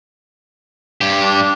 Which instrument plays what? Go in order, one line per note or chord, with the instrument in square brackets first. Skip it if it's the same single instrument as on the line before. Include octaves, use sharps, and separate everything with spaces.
[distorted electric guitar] G2 G4
[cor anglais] D4